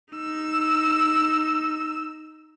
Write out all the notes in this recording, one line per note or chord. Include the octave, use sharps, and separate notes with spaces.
D#4 E6